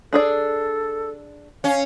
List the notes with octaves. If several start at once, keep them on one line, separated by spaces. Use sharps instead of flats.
D4 G#4 A4 D5
C#4 F5